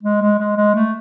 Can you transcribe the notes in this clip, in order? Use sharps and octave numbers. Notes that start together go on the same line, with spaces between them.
G#3
G#3
G#3
G#3
A3